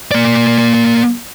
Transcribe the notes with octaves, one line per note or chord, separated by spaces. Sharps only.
A#3 D5